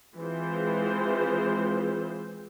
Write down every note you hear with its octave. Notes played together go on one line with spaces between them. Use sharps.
E3 G#3 C4 F4 G#4 C5